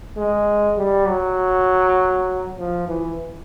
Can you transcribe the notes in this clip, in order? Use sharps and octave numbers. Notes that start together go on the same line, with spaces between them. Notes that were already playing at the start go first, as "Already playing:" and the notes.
G#3
G3
F#3
F3
E3